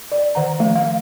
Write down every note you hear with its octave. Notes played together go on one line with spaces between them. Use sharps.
D5
D#3 F#5 A#5
F3 A3
F5